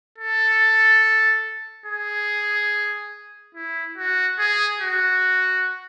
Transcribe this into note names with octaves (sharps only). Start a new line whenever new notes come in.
A4
G#4
E4
F#4
G#4
F#4